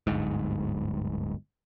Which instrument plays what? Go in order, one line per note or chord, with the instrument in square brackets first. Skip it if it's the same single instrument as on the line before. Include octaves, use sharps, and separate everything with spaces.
[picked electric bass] D1 G1 G#2